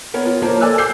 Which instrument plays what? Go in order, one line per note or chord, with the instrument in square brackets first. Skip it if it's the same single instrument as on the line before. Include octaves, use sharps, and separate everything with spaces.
[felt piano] B3 A#4 C#5
F4
A#3 F4 A#4 C5 C#5 A5
A4 D5 G#5 D6 E6 F#6
D6 E6 G6 C7